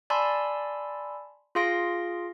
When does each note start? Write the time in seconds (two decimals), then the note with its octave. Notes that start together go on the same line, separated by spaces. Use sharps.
0.10 D5 G#5 A5 B5 C6 E6
1.55 F4 G#4 F5 C6 A#6 D7